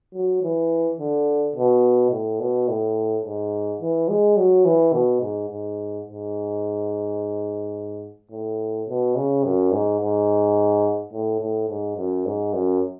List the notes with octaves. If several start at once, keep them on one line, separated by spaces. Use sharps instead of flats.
F#3
E3
D3
B2
A2
B2
A2
G#2
E3
G#3
F#3
E3
B2
G#2
G#2
G#2
A2
B2
C#3
F#2
G#2
G#2
A2
A2
G#2
F#2
G#2
F#2